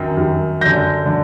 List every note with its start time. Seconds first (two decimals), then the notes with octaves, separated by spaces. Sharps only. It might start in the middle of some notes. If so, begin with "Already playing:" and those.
Already playing: F#2 D#3
0.17 F#2 D#3
0.61 F#2 D3 G6 A#6
1.06 D3